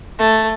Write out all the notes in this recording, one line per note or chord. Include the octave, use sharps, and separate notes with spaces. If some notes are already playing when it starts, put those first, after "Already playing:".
A3